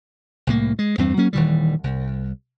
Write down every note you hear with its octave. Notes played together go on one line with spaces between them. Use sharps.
C2 A2 A#3
G#3
E2 G2 C4
F#3 A#3 C#4
D#1 D#3 E3 G3
C2